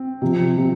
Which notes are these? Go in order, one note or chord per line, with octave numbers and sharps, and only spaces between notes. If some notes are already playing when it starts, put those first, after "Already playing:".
Already playing: C4
C3 F3
C3 F3